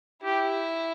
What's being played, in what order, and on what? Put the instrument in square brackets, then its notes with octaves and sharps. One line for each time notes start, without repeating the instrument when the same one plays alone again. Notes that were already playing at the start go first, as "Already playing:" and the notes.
[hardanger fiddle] E4 [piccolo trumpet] G4